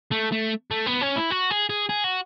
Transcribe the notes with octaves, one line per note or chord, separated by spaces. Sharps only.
A3
A3
A3
B3
C#4
E4
F#4
G#4
G#4
G#4
F#4